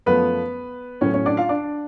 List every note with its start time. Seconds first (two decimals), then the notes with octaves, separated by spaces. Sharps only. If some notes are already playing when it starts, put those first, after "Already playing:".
0.06 F#2 F3 A3 B3 B4
1.01 A2 F#3 A3 C#4 C#5
1.14 C#4 C#5
1.26 D4 D5
1.37 F4 F5
1.49 D4 D5